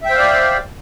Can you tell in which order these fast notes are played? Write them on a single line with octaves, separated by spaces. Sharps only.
E5 G5 C5 F5 D5